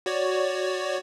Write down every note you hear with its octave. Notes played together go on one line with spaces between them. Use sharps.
F#4 C#5 D5